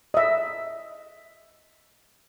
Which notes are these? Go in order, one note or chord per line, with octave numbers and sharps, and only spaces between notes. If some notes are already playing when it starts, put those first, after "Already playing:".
D#5 E5